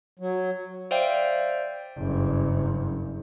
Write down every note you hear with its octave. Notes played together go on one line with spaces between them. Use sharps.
F#3
C5 D5 E5 F5 G5
F#1 G2